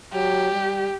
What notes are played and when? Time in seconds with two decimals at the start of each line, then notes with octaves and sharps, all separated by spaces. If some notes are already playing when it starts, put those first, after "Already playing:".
0.14 F#3 G4
0.52 G3